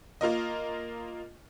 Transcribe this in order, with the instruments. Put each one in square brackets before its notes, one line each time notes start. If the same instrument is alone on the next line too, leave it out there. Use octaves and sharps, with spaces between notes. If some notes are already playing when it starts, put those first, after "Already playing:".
[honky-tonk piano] A#3 F4 A#4 D#5